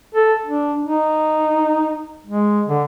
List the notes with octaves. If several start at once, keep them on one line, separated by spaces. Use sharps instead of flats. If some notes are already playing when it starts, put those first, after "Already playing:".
A4
D4
D#4
G#3
D3